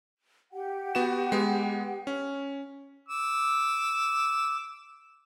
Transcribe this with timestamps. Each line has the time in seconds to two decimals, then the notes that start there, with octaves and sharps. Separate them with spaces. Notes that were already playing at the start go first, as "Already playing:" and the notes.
0.53 G4 F#5 G5
0.95 B3 F#4 E7
1.32 G#3 B3
2.07 C#4
3.09 D6 E6